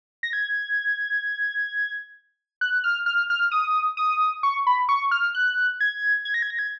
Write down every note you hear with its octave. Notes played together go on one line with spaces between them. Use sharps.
A#6
G#6
F#6
F6
F6
F6
D#6
D#6
C#6
B5
C#6
F6
F#6
G#6
G#6
A#6
G#6
A#6
G#6